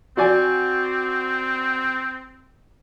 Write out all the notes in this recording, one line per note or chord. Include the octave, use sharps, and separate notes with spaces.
C4 F#4 D5 G#5